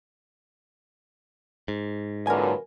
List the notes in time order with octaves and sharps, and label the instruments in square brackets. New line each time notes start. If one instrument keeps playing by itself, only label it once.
[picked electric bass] G#2
[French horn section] F#2 A#2 D3 [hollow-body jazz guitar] A#4 G#5 [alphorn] B4